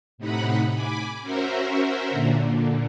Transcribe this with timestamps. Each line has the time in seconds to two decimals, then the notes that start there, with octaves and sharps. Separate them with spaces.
0.18 A2 C3 D#4 F#5 B5
0.74 G#5 B5 D6
1.22 C#4 F#4 A#4 C5 E5
2.10 A#2 D3